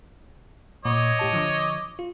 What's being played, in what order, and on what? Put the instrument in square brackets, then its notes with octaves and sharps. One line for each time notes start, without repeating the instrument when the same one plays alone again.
[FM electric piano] A#2 [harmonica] C#5 D#5 D6
[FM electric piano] A2 G4 A5
D3 F3
F4